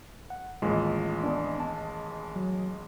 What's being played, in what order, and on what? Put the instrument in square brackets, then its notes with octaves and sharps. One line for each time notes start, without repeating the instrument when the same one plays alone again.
[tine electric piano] F#5
[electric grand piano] A1 D#2 G#3 [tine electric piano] F4
[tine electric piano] B3 D4
A5
F#3